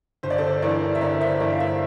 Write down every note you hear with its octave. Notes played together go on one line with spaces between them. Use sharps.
G1 C5
D5
A4 C5
G2 E3 A#4 D5
E5
G1 A#4 D5
C5 E5
G2 E3 A#4 D5
F5
C5 E5